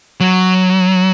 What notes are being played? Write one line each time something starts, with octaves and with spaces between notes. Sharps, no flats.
F#3